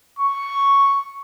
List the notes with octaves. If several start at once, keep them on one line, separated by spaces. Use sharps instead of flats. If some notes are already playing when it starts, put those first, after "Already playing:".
C#6